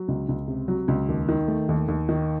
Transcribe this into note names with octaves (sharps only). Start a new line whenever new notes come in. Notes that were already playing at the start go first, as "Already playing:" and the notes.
Already playing: F#3
C#2
C#2
C3
F#3
C#2
D#2
D#3
A3
D#2
D#2
D#3